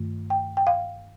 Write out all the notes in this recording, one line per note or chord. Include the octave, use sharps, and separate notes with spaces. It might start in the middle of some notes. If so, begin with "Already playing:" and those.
Already playing: G2 D#3 A3
G5
G5
F5